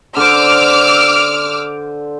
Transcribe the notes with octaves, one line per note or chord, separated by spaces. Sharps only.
D3 C5 D6 E6 F6